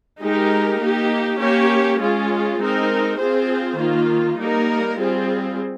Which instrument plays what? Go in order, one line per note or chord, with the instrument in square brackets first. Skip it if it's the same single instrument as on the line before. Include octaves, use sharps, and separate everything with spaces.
[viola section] G#3 D#4 G4 A#4
A#3 D#4 G4
A#3 C#4 G4 C#5
G#3 C#4 F4 G#4
G#3 C4 D#4 A#4
C4 F4 G#4 C5
D#3 A#3 F4
G3 A#3 D#4 A#4
G3 C4 F4 G#4